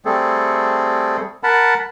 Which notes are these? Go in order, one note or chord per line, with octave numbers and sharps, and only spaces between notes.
G3 A3 C4 G#4 A4
A#4 F#5 A5 B5